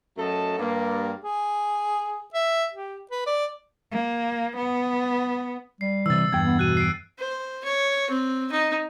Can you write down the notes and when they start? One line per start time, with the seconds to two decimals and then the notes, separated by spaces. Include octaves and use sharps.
0.17 F#2 F#3 A3 A4 D#5 A5
0.59 G2 A#3
1.23 G#4
2.34 E5
2.73 G4
3.11 B4
3.26 D5
3.92 A#3
4.57 B3
5.81 G3 C7
6.06 C3 E3 E6 A6
6.33 E2 G2 G5 G#6
6.46 B3
6.59 B2 F#6 D#7
6.77 C7 D7
7.18 C5
7.64 C#5
8.10 C4
8.52 D#4